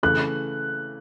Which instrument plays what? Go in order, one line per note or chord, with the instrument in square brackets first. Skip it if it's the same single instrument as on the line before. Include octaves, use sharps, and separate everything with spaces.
[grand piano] C#3 E3 A3 [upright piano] F#6